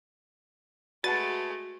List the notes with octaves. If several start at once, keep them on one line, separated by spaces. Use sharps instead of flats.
G#3 A3 F#4 B4 F#5 A5 A6